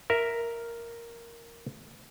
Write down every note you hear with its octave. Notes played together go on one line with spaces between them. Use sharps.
A#4 E5